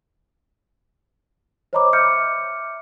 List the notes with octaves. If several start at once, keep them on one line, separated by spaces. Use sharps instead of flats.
C5 C#5 D#5 A#5 B5 D6
E5 D6 F6 G6 C#7